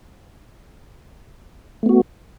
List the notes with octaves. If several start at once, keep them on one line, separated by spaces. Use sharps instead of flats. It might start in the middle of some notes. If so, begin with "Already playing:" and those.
A3 B3 F#4